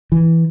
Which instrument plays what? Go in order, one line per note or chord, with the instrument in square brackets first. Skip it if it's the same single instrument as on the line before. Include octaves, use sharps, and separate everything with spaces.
[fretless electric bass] E3